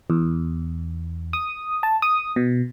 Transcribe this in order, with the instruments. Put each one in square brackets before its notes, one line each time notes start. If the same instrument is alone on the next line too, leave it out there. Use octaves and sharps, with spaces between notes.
[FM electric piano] E2
D#6
A5
D#6
B2